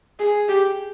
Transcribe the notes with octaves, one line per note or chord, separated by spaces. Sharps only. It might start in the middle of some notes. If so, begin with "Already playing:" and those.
G#4
G4